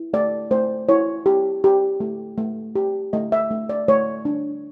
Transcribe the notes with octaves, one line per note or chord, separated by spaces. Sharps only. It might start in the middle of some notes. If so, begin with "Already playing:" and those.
Already playing: E4
A3 D5
A3 C5
E4 C#5
G4
G4
A3
A3
G4
A3 D#5
E5
A3
D5
A3 C#5
D4